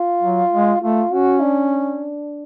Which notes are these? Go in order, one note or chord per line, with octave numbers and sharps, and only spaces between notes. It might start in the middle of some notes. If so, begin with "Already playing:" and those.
Already playing: F4
F#3
G#3
A3 F4
C#4 F#4
D4